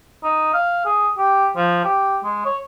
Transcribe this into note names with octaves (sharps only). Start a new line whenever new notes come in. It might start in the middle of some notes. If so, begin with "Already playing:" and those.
D#4
F5
G#4
G4
F3
G4
G#3
C#5